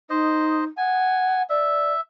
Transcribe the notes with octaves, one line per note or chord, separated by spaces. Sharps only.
D#4 C5 D#5
F#5 G#5
D5 E5